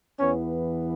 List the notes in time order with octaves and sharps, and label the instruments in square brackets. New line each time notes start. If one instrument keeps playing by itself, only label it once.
[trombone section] E2 E3 B3 C#4